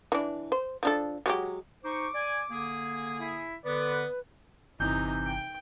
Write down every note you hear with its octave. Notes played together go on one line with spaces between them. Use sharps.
E3 D4
C5
F3 D4 A4
F#3 G#3 G4
D#4 C5 C#6 D6
D5 G#5
D3 A#3 G#4
E4
D3 B3 B4 D5
G1 C3 E3 D#4 G6
G5